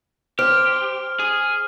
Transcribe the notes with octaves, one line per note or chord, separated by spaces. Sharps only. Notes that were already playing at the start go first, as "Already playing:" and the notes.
G4 C5 F6
G#4